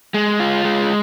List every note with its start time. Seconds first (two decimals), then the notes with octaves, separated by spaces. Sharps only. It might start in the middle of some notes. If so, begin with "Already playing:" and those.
0.14 G#3
0.40 F4
0.65 G#3